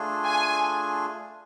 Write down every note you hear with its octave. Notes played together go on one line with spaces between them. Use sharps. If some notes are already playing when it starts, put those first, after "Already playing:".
Already playing: A3 D4 F4 G#4
G#5